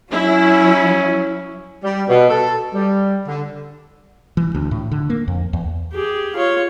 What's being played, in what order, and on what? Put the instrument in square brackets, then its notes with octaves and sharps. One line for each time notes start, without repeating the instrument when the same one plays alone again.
[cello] F#3 [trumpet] C#4 [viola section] E4
[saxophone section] G3
B2
A4
G3
D3
[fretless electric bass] E3
D2
A2
D3
A#3
F2
E2
[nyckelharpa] G4 G#4
F4 C#5